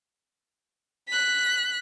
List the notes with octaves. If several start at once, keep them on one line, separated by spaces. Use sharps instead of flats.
F#6 B6